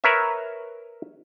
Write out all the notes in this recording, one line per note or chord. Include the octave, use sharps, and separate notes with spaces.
A#4 B4 C#5 E5